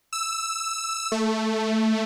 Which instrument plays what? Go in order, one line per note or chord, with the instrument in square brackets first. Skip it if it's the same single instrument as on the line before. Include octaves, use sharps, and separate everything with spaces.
[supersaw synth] E6
A3